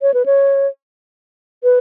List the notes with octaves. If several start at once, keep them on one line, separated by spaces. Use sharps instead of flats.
C#5
B4
C#5
B4